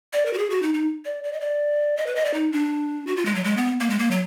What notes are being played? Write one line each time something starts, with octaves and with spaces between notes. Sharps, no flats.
D5
A#4
F#4
G#4
F#4
D#4
D#4
D5
D5
D#5
D5
D#5
B4
D#5
D5
D#4
D4
F#4
F4
G#3
F#3
G#3
B3
A#3
G#3
A#3
F#3